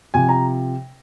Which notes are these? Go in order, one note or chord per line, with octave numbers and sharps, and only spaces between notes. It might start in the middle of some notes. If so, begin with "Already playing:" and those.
C3 F3 G#5
A#5